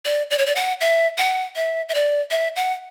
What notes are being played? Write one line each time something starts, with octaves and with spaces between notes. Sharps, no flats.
D5
D5
C#5
D5
F#5
E5
F#5
E5
E5
D5
E5
F#5